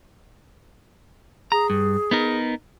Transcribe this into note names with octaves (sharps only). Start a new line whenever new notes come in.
G#4 A#5
G2
B3 D#4 A#4